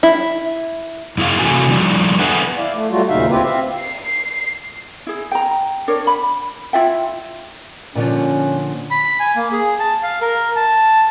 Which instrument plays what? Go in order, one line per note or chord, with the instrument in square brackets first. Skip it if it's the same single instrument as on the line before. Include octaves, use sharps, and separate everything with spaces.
[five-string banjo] E4
[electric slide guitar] F#2 E4 G#4 F5
C3 E3 A3 F4 F#4 G#5
F3 G3 D4 E4 D5
A4 B4 E5 F#5 G#5
[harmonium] E4 D5 F5
A3
F#3 G3 A3 F4 F#4
D#2 A#2 C#3 D#4 E5 F5
D2 C4 E4 F4 G4 B4
C4 E5 F5
[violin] C7
[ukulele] E4 G#4
G5 A#5
D4 A#4 C#5
B5
E4 F4 E5 G5
[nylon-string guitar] A#2 D3 F3 [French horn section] C#4
[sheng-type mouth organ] B5
G#5
A#3
G#4
A5
F5
A#4
A5